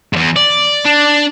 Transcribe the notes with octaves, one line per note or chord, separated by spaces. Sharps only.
E2 G#2
D5
D4